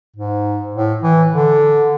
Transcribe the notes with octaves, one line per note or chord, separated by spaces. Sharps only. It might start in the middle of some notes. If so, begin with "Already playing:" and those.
G#2
A2
E3
D3